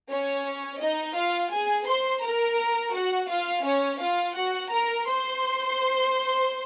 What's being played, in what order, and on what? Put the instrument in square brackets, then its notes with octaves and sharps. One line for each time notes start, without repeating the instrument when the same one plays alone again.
[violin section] C#4 C#5
D#4 D#5
F4 F5
G#4 G#5
C5 C6
A#4 A#5
F#4 F#5
F4 F5
C#4 C#5
F4 F5
F#4 F#5
A#4 A#5
C5 C6